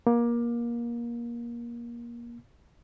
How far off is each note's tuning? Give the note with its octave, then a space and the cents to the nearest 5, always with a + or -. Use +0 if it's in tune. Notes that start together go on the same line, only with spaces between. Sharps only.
A#3 +25